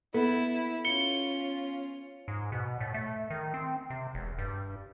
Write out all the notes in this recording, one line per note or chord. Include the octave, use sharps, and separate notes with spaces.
B3 E4 A4
C#4 F4 C#7 G7
G#2
B2
A2
A3
D#3
C4
C3
E1
G2